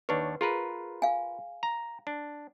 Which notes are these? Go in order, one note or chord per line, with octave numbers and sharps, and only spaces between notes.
D#2 D4 B4 C#5
F4 G#4 A#4 B4
F5 G#5
A#5
D4